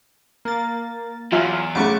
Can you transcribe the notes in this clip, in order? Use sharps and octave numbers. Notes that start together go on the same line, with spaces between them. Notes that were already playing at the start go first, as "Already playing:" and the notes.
A#3 A6
E2 F#3 F4 E5 G#5
B1 C#3 A3 C#6 D6